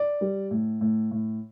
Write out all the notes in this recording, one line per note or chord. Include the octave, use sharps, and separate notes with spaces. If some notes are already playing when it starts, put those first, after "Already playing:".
Already playing: D5
G3
A2
A2
A2